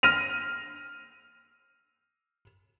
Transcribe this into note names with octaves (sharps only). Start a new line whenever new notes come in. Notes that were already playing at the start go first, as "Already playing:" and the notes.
F6 A#6 D#7 F7